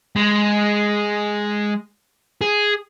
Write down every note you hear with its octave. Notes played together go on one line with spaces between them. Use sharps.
G#3
G#4